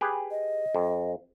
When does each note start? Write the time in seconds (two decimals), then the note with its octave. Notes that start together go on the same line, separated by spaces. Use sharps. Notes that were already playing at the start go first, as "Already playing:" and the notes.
0.01 G4 G#4 B4
0.31 D#5
0.75 F2